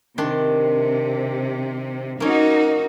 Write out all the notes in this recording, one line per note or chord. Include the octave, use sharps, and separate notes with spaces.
C3 D#3 D4 C6
A#3 C#4 D#4 F#4